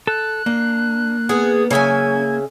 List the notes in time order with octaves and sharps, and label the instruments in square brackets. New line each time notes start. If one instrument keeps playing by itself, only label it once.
[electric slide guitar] A4 [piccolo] F#6
[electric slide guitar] A#3 [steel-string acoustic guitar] D4
[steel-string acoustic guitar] D3 B3 F#5 [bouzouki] G#4
[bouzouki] C#3 E5 G#5 [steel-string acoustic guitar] F#3 C#4 [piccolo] G#6